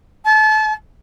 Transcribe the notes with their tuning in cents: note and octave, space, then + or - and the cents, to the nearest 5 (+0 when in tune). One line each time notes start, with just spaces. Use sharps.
A5 -30